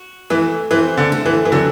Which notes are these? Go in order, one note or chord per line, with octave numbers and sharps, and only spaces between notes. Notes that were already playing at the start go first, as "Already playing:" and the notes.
Already playing: F#4
E3 A3
E3 C4
D3
A3
E3
E3
D3 F#3 E4